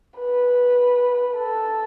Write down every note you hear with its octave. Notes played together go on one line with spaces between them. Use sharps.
B4
A4